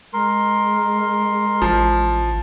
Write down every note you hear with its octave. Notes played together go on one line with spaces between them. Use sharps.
G#3 A#4 C6
A1 F3